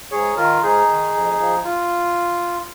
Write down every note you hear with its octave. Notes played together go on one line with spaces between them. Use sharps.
G#2 G#4 C#5
D#3 F4 A#4
G#2 D#4 G#4
D#3
F2
F3
F4